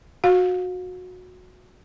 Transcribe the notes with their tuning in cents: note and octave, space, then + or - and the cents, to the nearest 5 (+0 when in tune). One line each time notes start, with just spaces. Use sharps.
F#4 -20 F5 +30